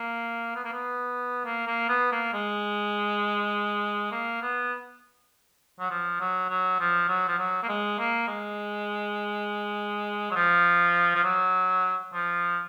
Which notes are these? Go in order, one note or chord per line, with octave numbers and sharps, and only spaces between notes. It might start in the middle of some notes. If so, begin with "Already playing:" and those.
Already playing: A#3
B3
A#3
B3
A#3
A#3
B3
A#3
G#3
A#3
B3
F#3
F3
F#3
F#3
F3
F#3
F3
F#3
A#3
G#3
A#3
G#3
F#3
F3
F3
F#3
F3